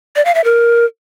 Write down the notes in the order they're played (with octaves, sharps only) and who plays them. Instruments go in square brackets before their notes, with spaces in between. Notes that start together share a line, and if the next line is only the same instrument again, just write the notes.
[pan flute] D5
F5
E5
A#4